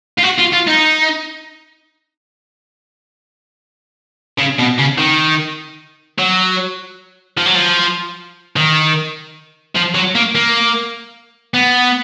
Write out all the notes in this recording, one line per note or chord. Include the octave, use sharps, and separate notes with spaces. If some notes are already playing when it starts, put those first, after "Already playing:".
F4
F#4
F4
F4
D#4
C#3
B2
C#3
D#3
F#3
F3
F#3
F3
D#3
F3
F#3
A#3
A#3
B3